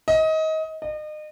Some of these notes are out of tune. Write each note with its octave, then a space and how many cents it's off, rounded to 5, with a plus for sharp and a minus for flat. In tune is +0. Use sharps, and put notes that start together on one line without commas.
D#5 +25
D#5 -35